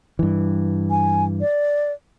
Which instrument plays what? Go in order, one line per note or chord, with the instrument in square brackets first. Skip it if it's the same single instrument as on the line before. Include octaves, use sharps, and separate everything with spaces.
[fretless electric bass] G2 E3
[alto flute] G#5
D5